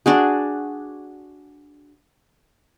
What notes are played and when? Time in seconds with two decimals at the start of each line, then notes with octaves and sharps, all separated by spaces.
0.06 D4 F#4 G#4